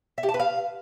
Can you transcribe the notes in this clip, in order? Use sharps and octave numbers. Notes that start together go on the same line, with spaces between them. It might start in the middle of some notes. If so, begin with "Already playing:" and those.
E5
G4
A5
B4
F5